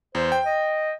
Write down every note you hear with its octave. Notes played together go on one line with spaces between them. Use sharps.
E2 C5
G5
D#5